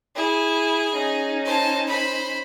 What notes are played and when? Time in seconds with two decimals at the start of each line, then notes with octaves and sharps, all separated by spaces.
0.16 E4 G#4
0.94 C#4 D#4
1.45 C5 A5
1.87 C5 B5